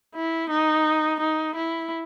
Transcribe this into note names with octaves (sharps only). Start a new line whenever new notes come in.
E4
D#4
D#4
E4